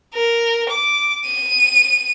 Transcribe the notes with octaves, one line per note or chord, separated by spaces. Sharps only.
A#4
D6
D#7